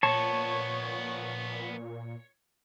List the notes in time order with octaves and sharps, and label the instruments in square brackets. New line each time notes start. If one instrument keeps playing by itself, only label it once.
[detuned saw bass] A#2 [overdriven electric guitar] F3 B3 [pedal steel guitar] C#5 [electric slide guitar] A5